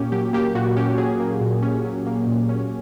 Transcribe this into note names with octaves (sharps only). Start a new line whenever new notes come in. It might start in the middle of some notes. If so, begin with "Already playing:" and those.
Already playing: A#2 A#3 C#4 G4
F#3 G4
A#3 G4
A#2 F#4
C#4 G4
F#3 G#4
A#3
A#2
C#4
F#3
A#3
A#2
C#4